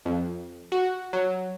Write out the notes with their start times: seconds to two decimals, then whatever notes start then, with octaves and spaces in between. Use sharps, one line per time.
0.05 F2
0.72 F#4
1.13 F#3